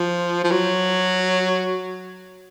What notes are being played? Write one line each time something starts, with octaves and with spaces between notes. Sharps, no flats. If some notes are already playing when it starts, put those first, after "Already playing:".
Already playing: F3
F3
F#3